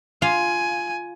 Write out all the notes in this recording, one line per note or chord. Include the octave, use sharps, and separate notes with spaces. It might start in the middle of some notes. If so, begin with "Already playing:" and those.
F4 F5 G#5